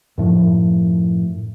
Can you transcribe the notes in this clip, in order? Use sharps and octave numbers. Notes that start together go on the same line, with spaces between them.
F#2 A2 F3